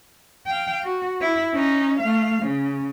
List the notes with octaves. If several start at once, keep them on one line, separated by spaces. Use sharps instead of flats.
F5 G5
F#4
E4
C#4 D#4
A3 F5
C#3